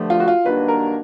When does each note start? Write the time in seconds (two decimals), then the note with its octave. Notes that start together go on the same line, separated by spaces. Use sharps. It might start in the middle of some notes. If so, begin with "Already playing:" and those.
Already playing: G2 D3 F3 A3
0.10 F4
0.20 F#4
0.28 F4
0.45 G2 D#3 F#3 A#3 D4 B4
0.68 A#4